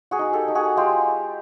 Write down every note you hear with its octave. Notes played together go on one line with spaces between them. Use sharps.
F#4 G#4
D#4
G4 A4
D#4
F#4 G#4
G#3 F4 G4